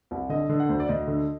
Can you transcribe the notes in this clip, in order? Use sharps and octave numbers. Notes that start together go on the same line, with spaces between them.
C2
D3 D#5
D3
F#5
D2 C5
D5
D2 D#5
D3